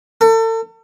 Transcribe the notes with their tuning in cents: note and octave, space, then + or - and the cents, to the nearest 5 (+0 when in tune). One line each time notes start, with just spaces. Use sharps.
A4 +40